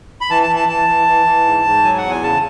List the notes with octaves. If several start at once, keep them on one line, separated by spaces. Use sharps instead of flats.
B5
E3 A5
A5
E3
A5
E3 A5
E3
E3
E3
G#2
G#2
F#3 G#5
F#5
E2
G#5
C#3 A5